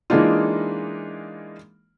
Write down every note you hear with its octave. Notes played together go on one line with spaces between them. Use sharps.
E3 G#3 A#3 D4 D#4 F4